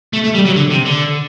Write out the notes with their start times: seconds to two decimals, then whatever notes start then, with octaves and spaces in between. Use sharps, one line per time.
0.13 A3
0.24 A3
0.35 G3
0.46 F#3
0.56 D3
0.71 C3
0.86 D3